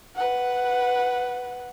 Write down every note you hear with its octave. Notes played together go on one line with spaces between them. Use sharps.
B4 F#5